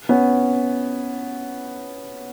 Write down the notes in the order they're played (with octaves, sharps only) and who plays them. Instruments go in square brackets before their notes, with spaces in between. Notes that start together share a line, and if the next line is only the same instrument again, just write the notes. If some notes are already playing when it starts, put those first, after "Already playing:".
[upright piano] B3 C#4